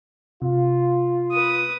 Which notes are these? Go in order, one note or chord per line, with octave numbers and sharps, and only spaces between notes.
C3 F4
B4 D#6